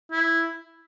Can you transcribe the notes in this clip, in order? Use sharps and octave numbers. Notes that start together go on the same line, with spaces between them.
E4